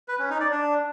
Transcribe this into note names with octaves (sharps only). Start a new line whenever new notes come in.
B4
C#4
D#4
D5
D4